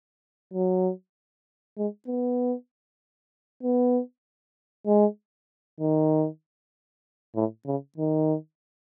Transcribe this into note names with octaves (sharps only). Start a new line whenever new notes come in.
F#3
G#3
B3
B3
G#3
D#3
A2
C#3
D#3